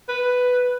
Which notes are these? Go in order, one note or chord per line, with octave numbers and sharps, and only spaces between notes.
B4